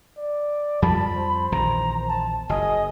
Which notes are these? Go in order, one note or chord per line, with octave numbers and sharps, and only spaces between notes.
D5
F2 F3 G3 A5 B5
C5
A#1 E2 D#3 A#5
A5
F#1 D#5 G#5